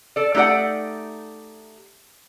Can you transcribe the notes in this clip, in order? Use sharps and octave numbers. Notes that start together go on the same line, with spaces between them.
A4 D5
A3 D#4 G4 D5 F#5